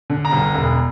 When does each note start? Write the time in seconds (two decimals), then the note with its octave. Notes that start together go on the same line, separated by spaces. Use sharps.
0.10 D3
0.25 A#5
0.32 G1
0.55 E1